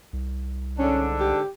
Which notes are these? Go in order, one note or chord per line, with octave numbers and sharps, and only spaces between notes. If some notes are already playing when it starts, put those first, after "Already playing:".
C2
G#2 D3 C#4 D4
G4